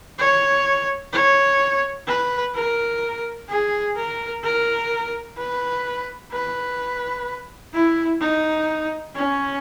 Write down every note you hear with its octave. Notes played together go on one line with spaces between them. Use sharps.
C#5
C#5
B4
A#4
G#4
A#4
A#4
B4
B4
E4
D#4
C#4